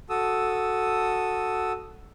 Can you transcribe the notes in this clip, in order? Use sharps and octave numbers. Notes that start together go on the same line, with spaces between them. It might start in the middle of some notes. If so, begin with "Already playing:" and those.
F#4 A4 D#6 E6